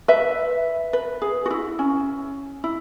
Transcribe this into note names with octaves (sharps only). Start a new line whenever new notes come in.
B4 E5
B4
G#4
F#4
E4
C#4
E4